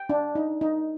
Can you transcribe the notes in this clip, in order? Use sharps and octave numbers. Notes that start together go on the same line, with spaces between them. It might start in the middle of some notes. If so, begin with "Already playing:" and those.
Already playing: G5
D4
D#4
D#4